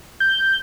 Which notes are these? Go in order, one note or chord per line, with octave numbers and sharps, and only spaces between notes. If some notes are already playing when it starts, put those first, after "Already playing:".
G6